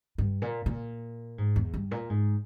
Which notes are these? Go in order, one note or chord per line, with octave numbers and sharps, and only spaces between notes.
G2
A#2
A#2
G#2
E2
G2
A#2
G#2